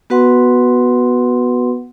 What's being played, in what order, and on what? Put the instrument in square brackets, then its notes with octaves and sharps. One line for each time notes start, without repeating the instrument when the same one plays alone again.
[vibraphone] B3 F#4 B4 F#5 C6